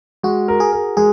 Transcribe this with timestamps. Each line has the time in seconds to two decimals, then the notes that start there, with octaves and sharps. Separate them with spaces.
0.23 G#3 F#4
0.48 A#4
0.60 G#4
0.72 A#4
0.97 G#3 G#4